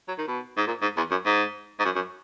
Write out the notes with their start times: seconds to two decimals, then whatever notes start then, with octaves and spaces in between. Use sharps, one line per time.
0.08 F#3
0.18 D#3
0.28 B2
0.57 G#2
0.67 A#2
0.82 G#2
0.97 E2
1.11 F#2
1.26 G#2
1.79 G#2
1.85 F#2
1.95 F#2